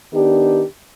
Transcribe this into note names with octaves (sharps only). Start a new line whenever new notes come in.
D#3 B3 D4 G4